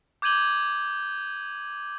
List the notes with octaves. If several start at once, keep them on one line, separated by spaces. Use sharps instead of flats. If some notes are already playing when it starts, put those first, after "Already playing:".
D6 G6 G#6 D#7 F#7 G7